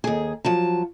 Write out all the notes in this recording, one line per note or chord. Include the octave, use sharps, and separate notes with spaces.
D#2 G#4
F3 F#3 A5